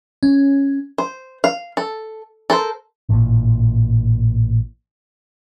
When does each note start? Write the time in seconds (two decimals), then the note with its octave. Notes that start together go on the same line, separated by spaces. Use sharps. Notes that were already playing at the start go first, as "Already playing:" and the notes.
0.23 C#4
0.98 C5
1.44 F5
1.77 A4
2.50 A4 A#4 C5
3.09 A1 A#2